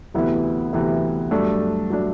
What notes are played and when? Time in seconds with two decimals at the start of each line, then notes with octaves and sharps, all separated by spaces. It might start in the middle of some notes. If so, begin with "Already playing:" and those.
0.14 D2 C3 E3 B3 E4
0.73 D2 C3 E3 B3 E4
1.31 G2 F#3 A3 D4
1.90 F#3 A3 D4